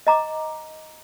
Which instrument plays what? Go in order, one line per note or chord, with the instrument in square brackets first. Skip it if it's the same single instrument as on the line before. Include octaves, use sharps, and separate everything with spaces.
[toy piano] D#5 A#5 D6